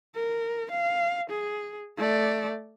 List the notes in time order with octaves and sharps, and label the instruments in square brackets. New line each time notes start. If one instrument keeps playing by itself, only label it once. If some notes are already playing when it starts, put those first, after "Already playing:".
[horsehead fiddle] A#4
F5
G#4
A3 D5